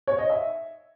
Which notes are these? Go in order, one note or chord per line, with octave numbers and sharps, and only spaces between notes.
C#5
D#5
E5